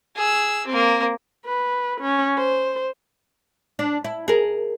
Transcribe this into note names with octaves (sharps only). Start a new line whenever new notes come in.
G#4 E6
A#3 C4
B4
C#4
C5
D4
E4
G#4 A#4